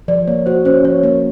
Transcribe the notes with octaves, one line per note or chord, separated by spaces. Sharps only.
F3 D5
A#3 C#5
F#4 C5
C#4 C5
F3 C#5
A#3